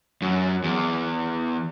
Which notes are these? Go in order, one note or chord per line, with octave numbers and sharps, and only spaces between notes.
F#2
E2